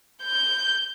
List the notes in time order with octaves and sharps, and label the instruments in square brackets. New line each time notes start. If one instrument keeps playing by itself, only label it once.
[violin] G6